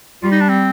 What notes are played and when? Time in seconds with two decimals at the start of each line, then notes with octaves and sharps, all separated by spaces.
0.23 G3 F4
0.32 D#4
0.41 D4
0.49 C4